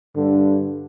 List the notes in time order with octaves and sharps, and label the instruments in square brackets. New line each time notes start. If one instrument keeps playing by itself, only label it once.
[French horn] G2 [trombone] D3